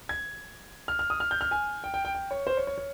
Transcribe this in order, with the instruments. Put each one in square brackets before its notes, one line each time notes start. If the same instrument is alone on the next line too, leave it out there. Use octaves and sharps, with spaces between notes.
[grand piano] G#6
F6
F6
D#6
F6
G6
F6
G#5
G5
G5
G5
G5
C#5
C5
C#5
C#5
C#5